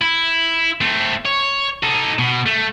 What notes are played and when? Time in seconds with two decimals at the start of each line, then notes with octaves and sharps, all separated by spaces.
0.02 E4
0.81 A3 C4
1.26 C#5
1.83 D#4 A4
2.19 B2
2.46 A3